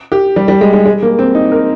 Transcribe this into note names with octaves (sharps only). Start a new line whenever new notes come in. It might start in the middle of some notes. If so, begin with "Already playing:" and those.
G4
G3
G3
G#3
G#3
G#3
A#3
C4
D#4
A#4